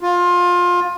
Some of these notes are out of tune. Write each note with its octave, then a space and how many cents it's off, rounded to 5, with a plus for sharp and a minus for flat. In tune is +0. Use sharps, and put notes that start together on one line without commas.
F4 +20